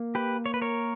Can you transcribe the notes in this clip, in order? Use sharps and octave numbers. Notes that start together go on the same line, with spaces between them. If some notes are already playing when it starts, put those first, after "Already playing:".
Already playing: A#3
G4 B4
C#5
B4
A#4 C#5